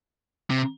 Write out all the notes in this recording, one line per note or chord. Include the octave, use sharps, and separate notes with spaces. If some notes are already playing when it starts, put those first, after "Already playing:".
C3